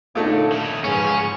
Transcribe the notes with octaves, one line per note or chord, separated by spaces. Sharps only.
F#2 A#2 D3 A3 D#4
D#3 E4
G#2 F3 C#4 G#4 B4